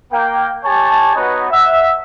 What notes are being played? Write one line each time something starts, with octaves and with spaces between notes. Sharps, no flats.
A#3 G5
G4 C#5 G#5 A5
B3 D#4 F#4 B4 C#5 D#6
E5 F#5